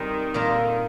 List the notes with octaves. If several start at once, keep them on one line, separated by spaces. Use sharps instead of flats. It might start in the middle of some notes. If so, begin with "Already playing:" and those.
Already playing: D#3 G3 C4 D#4
A#2 D#3 G3 A#3 F4 A#4
D3
D#3